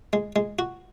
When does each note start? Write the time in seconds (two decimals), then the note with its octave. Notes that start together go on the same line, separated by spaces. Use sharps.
0.13 G#3
0.36 G#3
0.59 F#4